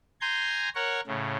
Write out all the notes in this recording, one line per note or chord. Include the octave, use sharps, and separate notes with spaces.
G#5 A#5 C6 G6
A#4 C#5 F#5 C#6
A2 C#3